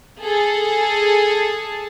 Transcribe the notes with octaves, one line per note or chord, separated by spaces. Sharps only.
G#4 A4 A5